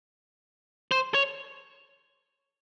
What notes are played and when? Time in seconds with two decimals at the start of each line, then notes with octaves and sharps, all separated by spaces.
0.91 C5
1.14 C#5